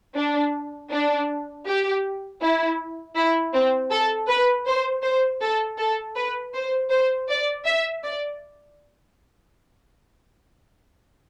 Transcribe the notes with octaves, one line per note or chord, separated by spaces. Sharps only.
D4
D4
G4
E4
E4
C4
A4
B4
C5
C5
A4
A4
B4
C5
C5
D5
E5
D5